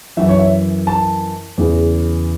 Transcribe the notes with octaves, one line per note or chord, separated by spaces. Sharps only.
F#2 E3 E5
C#5
E5
A5
E2 C#3 E3